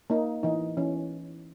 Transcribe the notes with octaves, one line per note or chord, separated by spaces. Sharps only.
A#3 D#4
E3 D#4
E3 C#4